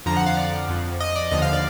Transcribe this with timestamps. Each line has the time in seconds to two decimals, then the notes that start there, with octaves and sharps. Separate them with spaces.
0.06 F2 D3 F3 A#5
0.16 F#5
0.26 F5
0.37 D5
0.69 F2 F3
1.00 D#5
1.16 D5
1.31 D#2 D3 F3 D#5
1.42 F5
1.53 D5